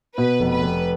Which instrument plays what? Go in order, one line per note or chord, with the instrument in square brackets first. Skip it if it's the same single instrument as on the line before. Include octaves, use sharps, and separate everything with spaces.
[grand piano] B2 [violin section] B4
[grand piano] F1
[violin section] B4
[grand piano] F1